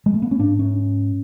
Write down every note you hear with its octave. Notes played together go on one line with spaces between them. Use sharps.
G#3
A3
B3
C#4
G#2 D4
C#4